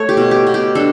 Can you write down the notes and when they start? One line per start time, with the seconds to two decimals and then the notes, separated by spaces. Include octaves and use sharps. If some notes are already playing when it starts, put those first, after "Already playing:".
Already playing: A3 C#5
0.09 G4
0.17 B2
0.31 G4
0.47 B2
0.54 G4
0.75 D4 A4